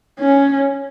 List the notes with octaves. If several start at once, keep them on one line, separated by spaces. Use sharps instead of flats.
C#4